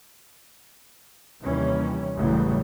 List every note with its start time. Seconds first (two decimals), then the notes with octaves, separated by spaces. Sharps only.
1.41 D#2 C3 E3 G3 C#4
2.16 A1 F#2 C#3 E3 G3